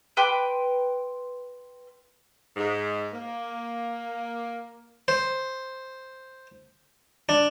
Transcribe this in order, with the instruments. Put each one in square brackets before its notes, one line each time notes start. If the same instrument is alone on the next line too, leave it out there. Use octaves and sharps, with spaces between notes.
[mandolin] B4 G5 C6 D6
[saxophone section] G#2
A#3
[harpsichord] C5
D4